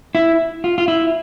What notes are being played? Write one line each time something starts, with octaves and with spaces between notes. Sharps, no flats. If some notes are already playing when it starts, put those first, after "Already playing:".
E4
F4
F4
E4